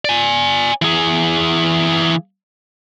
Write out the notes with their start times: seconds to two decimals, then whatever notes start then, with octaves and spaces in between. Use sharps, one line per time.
0.05 D5 G#5
0.82 E3 G#4